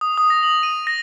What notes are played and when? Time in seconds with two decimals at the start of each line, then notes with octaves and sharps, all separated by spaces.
0.01 D#6
0.18 D#6
0.30 A#6
0.43 F#7
0.63 D#7
0.87 A#6